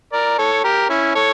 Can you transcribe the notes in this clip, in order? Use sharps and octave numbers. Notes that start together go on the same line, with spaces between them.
A#4 D5
A4 C#5
G4 A#4
C#4 E4
A4 C#5